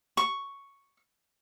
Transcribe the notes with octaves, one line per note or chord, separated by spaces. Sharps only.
C#6